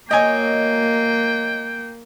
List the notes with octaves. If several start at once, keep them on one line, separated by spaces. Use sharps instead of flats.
F#3 A#3 D#4 C#5 D#5 G5 G#5